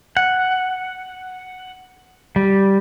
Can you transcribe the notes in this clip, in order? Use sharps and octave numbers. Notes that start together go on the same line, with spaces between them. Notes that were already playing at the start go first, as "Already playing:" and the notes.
F#5
G3